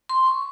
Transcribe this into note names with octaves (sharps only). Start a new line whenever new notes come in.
C6
C#6